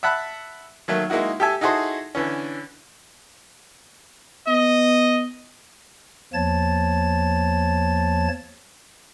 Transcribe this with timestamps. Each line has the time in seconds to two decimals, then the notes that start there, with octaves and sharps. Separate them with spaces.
0.03 E5 F#5 A5 B5 F#6
0.88 D#3 F#3 A3 A#3
1.10 G#3 A#3 D#4 E4 F#4
1.40 G4 A4 E5 G#5
1.61 D#4 E4 F#4 G#4 A4 C5
2.15 D3 E3 C#4
4.48 B3 D#5
6.34 E2 F3 A#3 C#5 A5 A6